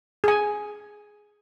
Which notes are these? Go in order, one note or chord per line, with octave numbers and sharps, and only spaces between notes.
G#4 G#5